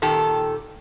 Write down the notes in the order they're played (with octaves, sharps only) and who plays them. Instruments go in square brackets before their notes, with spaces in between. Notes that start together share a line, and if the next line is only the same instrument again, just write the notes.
[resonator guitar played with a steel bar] A#2 D#3 G4 A4